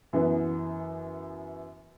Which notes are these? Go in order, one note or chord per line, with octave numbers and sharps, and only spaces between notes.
F#2 E3 B3